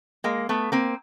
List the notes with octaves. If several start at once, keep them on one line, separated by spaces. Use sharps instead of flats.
G#3 A#3
A3 B3
A#3 C4